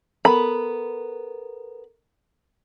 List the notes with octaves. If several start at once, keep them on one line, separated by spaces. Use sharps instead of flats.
B3 A4 A#4 A#5 B5